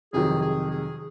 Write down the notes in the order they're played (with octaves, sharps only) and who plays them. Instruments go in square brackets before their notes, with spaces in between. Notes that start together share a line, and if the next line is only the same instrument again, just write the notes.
[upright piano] F2 C3 D#3 F#3 [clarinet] G#4
[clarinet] G#4
G#4